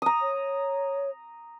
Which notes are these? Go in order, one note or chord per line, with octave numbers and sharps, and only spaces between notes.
A#5 D#6
C#5